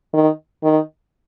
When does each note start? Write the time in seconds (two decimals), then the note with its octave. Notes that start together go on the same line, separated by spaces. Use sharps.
0.14 D#3
0.63 D#3